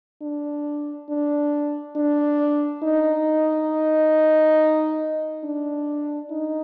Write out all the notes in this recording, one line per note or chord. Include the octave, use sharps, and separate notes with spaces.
D4
D4
D4
D#4
D4
D#4